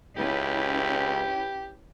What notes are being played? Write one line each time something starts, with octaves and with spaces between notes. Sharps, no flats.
C#2 C#4 E4 G4 B4